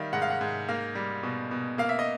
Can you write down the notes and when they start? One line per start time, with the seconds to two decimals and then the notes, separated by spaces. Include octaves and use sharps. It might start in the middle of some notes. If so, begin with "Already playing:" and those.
Already playing: D#3 G3 E5 F5
0.13 G#2 F#5
0.22 F5
0.30 F#5
0.41 G#2
0.69 A#3 F5
0.95 G3
1.23 B2
1.51 B2
1.78 A#3 F5
1.89 E5
1.99 D#5